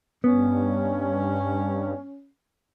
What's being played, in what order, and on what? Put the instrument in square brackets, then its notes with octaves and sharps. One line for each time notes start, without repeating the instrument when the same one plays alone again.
[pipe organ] G2 [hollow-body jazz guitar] B3 [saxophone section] C#4